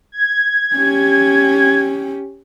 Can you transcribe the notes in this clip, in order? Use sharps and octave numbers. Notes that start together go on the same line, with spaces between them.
G#6
C#4 G4